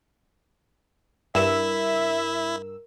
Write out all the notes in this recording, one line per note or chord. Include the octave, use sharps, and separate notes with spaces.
G2 E4 A#4 E5 E6